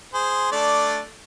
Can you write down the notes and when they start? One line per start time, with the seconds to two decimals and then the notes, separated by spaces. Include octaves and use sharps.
0.14 G#4 C5
0.52 A3 D4 D5